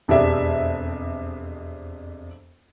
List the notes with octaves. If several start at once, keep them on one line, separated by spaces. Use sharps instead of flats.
E1 F2 D4 G4 G#4 E5